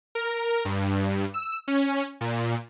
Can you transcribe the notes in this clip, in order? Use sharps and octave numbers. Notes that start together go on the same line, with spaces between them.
A#4
G2
E6
C#4
A#2